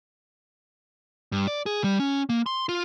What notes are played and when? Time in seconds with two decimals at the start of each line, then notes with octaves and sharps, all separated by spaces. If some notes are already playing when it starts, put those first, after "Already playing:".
1.32 G2
1.47 D5
1.66 G#4
1.84 G3
2.00 C#4
2.29 A#3
2.46 C6
2.69 F4